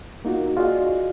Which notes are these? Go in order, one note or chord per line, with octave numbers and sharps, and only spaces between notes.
A#3 D#4 F4 F#4
F4 F#4 G#4 D5 D#5 F5